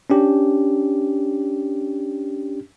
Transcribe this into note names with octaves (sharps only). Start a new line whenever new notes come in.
C#4 D4 G4